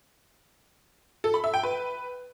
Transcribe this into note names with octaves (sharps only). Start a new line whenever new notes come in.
A4
B5
E5
G5
B4